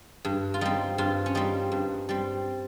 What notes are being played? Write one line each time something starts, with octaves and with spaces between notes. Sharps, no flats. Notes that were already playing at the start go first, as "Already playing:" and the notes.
G2
F4
G3 C4 D#4
G2 F4
C#4
G3 C4 D#4
G2
G3 C4